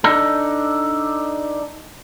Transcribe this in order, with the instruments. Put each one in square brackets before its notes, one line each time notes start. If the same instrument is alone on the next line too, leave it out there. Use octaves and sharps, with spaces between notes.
[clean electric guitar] D4 D#4 A4